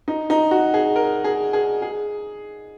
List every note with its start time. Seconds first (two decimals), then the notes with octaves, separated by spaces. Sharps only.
0.08 D#4
0.30 D#4
0.51 F#4
0.74 G#4
0.96 A#4
1.24 G#4
1.53 G#4
1.82 G#4